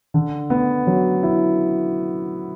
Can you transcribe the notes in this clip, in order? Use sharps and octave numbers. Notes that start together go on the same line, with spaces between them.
D3
B3
F#3
E4